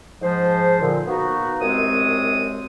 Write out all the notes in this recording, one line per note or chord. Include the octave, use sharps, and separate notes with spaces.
G#2 F3 C5
A#2 D3
A#3 B3 D#4 F#4
C2 F#2 G#3 C4 C#5 D#6